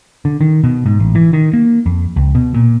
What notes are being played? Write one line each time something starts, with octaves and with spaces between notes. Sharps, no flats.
D3
D#3
B2
G#2
A1
E3
D#3
A#3
F2
C#2
B2
A#2